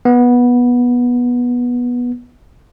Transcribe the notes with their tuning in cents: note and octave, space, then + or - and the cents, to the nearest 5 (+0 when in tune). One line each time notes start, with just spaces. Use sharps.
B3 -15